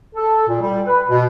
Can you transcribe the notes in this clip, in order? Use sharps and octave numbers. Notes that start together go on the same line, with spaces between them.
A4
A#2
G3
B4
B2